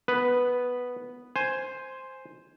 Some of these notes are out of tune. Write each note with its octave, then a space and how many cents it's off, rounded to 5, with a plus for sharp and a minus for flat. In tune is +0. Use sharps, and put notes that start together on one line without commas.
B3 +0 B4 +0
C5 +0 G#5 +0